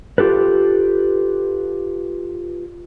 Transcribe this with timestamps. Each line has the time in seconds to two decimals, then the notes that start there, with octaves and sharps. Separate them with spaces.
0.18 F4 G4 A4 B4